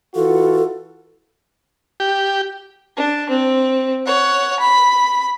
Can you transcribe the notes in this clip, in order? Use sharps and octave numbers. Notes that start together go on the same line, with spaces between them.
E3 F4 F#4 A4
G4
D4
C4
C#5 F#5
B5